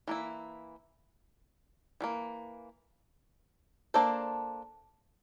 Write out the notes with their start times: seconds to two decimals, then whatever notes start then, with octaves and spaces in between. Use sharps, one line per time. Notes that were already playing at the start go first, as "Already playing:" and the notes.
0.08 E3 A#3 E4
2.01 E3 G3 A#3
3.94 A#3 D4 A4 C5